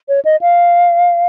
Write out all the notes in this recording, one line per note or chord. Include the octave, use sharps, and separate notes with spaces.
C#5
D#5
F5